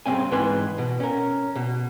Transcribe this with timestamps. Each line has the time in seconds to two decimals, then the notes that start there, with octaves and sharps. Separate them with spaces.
0.06 G2 C#3 F#3 A#3 C4 G#5
0.31 G#2 E3 B4 G#5 C6
0.78 B2
1.00 C#4 A#4
1.56 B2